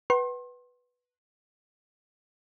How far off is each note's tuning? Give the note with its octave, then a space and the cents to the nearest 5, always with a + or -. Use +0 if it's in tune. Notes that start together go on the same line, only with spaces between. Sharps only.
B4 -5 F#5 +40 C6 +35